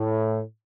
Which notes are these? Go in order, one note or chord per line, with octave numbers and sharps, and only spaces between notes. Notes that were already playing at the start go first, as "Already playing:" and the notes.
Already playing: A2